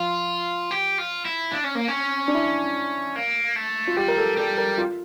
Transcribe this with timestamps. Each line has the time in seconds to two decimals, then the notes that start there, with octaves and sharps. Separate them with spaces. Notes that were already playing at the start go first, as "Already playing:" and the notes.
Already playing: F3 F4
0.71 G4
0.98 F4
1.25 E4
1.52 D4
1.64 C#4
1.75 A#3
1.88 C#4
2.28 D4
2.34 E4
3.16 A#3
3.56 A3
3.87 F4
3.96 G3 G4
4.08 A#4
4.18 A4
4.37 G3 A4
4.58 A#4
4.78 F4